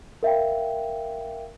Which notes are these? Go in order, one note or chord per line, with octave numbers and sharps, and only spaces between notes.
A#4 E5 F5 G5